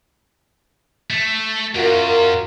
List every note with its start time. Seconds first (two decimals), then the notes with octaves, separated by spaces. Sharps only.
1.11 A3
1.75 F#2 F4 F#4 A#4